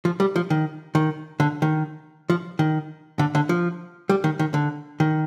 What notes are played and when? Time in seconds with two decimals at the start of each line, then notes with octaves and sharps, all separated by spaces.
0.05 F3
0.20 G3
0.36 F3
0.50 D#3
0.95 D#3
1.40 D3
1.62 D#3
2.30 F3
2.59 D#3
3.19 D3
3.35 D3
3.49 F3
4.09 G3
4.24 D#3
4.39 D#3
4.54 D3
5.00 D#3